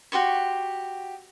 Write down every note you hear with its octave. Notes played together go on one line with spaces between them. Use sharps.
F#4 G4 C6 C#6